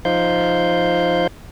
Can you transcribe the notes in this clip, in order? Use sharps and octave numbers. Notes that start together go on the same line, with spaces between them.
F3 D#4 C5 F5 G6